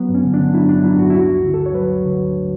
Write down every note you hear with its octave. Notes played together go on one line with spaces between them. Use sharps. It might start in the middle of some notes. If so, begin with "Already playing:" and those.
Already playing: F#3 B3
G2
C#4
D3
D4
D3
F#3 E4
G2 D4
F#3 E4
G2 F#4
E4
D2 F#4
D2
D3
A4
D2
C#5
F#3 B4
D2
D3
D2